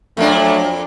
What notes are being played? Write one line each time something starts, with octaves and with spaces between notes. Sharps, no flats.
F2 F#3 A3 A#3 D4